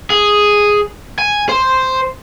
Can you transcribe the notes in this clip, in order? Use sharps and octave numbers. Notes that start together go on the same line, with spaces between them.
G#4
G#5
C5